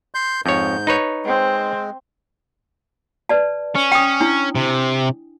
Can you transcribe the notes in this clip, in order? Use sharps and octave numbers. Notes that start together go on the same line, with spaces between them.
C6 G6
F2 G#2 C#5 G6
D#4 B4 C#5
G#3 C4
B4 D5 A5
C#4
G5 D#6
D4 E4 G#5
C3